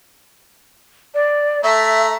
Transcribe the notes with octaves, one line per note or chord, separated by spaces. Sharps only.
D5
A3 A4 E5 A#5